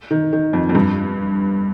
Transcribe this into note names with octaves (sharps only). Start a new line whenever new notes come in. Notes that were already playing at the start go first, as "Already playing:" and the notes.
D#3
D#3
F2
F2
G2